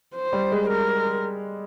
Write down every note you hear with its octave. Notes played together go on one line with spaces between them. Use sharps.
C5
G3
G#3
A#4